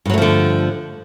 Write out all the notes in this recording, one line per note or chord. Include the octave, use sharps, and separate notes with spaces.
G2 D3 F3 F#3 A3